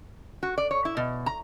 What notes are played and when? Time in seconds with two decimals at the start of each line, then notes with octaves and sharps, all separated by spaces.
0.43 F#4
0.58 D5
0.71 C#5
0.85 E4
0.97 B2
1.26 A#5